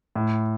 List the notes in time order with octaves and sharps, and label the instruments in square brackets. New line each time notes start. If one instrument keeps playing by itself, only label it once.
[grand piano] A2